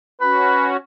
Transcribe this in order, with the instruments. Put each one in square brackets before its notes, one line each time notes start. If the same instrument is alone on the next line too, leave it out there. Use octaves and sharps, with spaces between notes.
[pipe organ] C#4 F#4 [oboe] B4